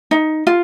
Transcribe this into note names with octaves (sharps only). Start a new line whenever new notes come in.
D#4
F4